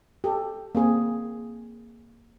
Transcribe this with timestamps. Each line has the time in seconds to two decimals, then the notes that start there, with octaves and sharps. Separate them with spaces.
0.24 G4 A4
0.75 A#3 C4 G#4